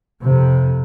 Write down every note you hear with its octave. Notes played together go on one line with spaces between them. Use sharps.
F2 C3